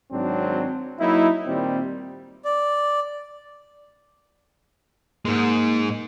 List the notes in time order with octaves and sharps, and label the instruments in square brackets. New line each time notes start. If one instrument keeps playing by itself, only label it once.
[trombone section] G#1 G#2 F#3 C4 D4
F#3 A#3 D#4 E4
A#2 D#3 G3 C4
[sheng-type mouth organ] D5
[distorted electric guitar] G#2 G#3 [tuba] A#3